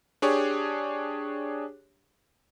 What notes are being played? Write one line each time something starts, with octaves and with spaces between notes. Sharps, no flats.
D4 G4 G#4 C#5